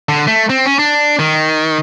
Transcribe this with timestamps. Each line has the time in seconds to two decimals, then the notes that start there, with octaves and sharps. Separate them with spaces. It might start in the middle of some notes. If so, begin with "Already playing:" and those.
0.09 D3
0.28 A3
0.50 C4
0.66 C#4
0.79 D4
1.19 D#3